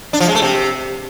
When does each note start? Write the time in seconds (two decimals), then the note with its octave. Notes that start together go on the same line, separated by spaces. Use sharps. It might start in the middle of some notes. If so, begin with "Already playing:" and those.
0.13 D4
0.20 F3
0.28 G#3
0.35 A3
0.42 C3